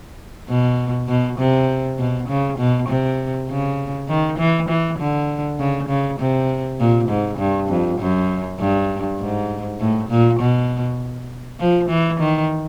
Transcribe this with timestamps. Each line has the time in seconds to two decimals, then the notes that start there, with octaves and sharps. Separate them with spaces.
0.49 B2
1.08 B2
1.39 C3
1.99 B2
2.29 C#3
2.59 B2
2.89 C3
3.49 C#3
4.08 D#3
4.38 E3
4.69 E3
4.99 D3
5.59 C#3
5.89 C#3
6.20 C3
6.79 A#2
7.09 G#2
7.38 G2
7.69 F2
7.99 F#2
8.59 G2
9.19 G#2
9.80 A2
10.09 A#2
10.40 B2
11.60 F3
11.89 E3
12.20 D#3